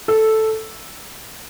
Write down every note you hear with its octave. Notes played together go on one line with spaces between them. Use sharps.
A4